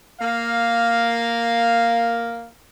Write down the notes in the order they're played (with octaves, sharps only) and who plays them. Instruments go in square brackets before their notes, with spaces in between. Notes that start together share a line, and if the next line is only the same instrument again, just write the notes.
[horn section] A#3 F5